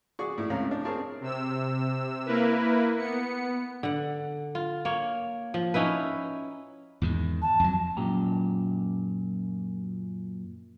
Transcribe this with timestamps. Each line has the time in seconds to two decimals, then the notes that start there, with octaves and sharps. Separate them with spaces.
0.19 F#4 G#4 D5 C#6
0.38 A2 E4
0.50 C#2 A2 C3 C#5 F5 A#5
0.71 D4
0.85 C4 G#4 A#4 C#5 A5
1.20 C3 E6
2.25 A#3 E4 A#4 B4
2.98 B3 C#7
3.83 D3 F#5
4.55 F4
4.85 A#3 C#5
5.54 F3
5.74 C#4 D#4 E4 B4
7.02 E2 G#2 D#3
7.42 A5
7.60 F2 F#3
7.97 F#2 A#2 G4 A#5